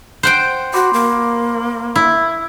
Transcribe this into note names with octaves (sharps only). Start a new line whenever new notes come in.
C5 F#5 G5
F#4 B5 C6 D6
A#3
E4